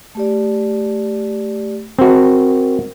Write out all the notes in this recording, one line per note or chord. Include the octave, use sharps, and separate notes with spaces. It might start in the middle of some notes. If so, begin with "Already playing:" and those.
A3 G4 D5
C4 F#4 A#4